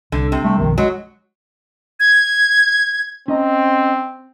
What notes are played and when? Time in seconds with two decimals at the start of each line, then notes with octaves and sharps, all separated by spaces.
0.12 C2 D3
0.32 C3
0.44 G3 A3
0.58 F#1 B1 D#3 F3
0.78 F#3 G#3
2.00 G#6
3.28 C4 C#4 D#5 A#5